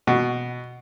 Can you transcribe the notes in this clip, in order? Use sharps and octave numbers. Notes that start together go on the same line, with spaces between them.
B2